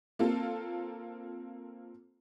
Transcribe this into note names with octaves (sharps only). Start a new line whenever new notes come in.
A#3 C4 F4 A4